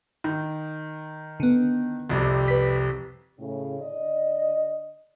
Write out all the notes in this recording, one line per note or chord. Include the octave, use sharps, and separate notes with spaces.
D#3
D3 B3
C2 F2 C3
B4 B6
A2 C#3
D3 D5 D#5